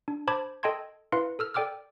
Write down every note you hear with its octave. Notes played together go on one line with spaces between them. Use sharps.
D4
C5 A5 B5 D6 G#6
A4 D#5 G5 A5 C6 G#6
E4 B4 F5 C6 C#7
A4 E6 F6
A4 D5 G5 D6 E6 F6